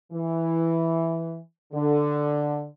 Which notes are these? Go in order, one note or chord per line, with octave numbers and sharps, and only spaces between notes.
E3
D3